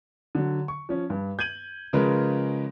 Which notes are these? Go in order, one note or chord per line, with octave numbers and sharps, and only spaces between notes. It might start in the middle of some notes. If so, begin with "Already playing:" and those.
D3 F#3
C#6
F3 C#4
G2
G6 G#6 D#7 F#7
C#3 F3 G#3 A#4 B4